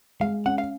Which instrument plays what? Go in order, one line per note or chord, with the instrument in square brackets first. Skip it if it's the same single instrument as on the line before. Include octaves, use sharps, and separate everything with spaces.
[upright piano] G#3 [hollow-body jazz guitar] F5
[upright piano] C#4 [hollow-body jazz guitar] F#5
[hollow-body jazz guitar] F5